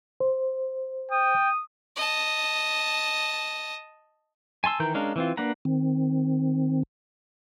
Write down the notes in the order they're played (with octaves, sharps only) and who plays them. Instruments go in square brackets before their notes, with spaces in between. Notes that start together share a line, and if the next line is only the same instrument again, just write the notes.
[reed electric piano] C5
[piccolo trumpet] G5 [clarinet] D#6
[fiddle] D#5 A5
[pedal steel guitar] G#5 A5 C6 E6
D#3 E3 A#4 A#5 G6
G#3 C#4 D4 A#4 F5
E3 C4 F4
A#3 D4 B4 F#5 A#5
[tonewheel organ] D#3 C4